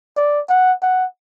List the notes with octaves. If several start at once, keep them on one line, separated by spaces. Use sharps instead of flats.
D5
F#5
F#5